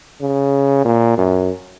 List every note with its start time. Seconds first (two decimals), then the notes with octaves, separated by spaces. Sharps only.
0.21 C#3
0.85 A#2
1.18 F#2